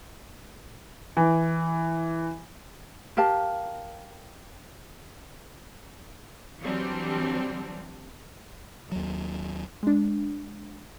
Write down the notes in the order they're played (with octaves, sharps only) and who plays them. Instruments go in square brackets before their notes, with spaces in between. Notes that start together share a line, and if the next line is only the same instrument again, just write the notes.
[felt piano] E3
[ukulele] G4 A#4 F5 A5
[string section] D3 E3 F#3 G3 C4 D4
[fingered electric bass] D#2 F#3
[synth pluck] G#3 D4